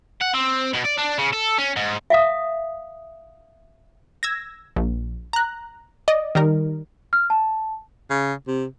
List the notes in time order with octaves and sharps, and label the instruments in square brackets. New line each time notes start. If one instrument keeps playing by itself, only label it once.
[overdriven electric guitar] F#5
C4
B2
D5
D4
C#3
A4
C#4
G#2
[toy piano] E5 F5 D#6
[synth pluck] E6 G#6 A#6
A#1
A#5 F#6
D5 D#5
D#3 G3 D#4 A#4
[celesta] F6
A5
[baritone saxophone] C#3
C3